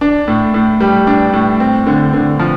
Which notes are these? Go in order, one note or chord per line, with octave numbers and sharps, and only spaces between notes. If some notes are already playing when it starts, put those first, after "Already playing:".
D4
A2
A2
G3
D4
A2
C4
D3
D3
F3